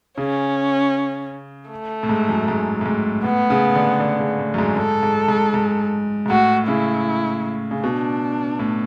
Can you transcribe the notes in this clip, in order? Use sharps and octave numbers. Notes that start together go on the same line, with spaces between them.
C#3 C#4
A3
A2
G#2
F#2
G#2
A2
G#2
A2 B3
C#3
D3
D3
C#3
A2
F#2
G#2
G#2 A4
G#2
G#2
G#2
G#2
A2 F#4
C#3 E4
C#3
B2 D4
A2